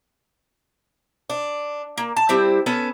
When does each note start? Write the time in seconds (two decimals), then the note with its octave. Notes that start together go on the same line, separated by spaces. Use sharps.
1.30 D4
1.98 A#3
2.17 A5
2.29 G3 C4 E4
2.66 B3 C#4 A4 B4